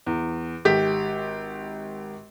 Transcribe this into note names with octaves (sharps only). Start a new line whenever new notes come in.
E2
G#1 G4 B6